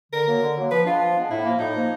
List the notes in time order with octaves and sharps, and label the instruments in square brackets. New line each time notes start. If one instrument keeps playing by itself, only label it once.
[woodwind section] D3 [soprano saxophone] A#4
[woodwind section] F#3 A#3
D3
F#3 A#3
[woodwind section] F3 [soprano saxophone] B4
[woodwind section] G#3 B3 D4 [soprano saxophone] F4
[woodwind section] F3
G#3 B3 D4
[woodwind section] A2 [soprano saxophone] E4
[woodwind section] F3 A#3
[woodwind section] A2 [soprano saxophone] D#4
[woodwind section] F3 A#3